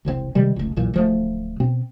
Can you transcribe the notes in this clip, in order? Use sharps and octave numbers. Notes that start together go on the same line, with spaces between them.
E1 C2 C#3 C4
C3 D#3 G3 G#3
F1 C#2
B1 E2 A#2
D1 F3 A3
B2 B3 C4